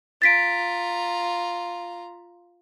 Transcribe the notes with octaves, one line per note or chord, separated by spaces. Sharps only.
F4 A#5 A6 B6 D7